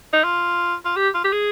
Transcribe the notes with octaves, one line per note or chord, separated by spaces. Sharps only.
D#4
F4
F4
G4
F4
G4
G#4